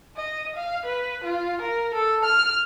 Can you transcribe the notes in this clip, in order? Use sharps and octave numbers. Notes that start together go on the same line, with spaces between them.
D#5
F5
B4
F4
A#4
A4
F6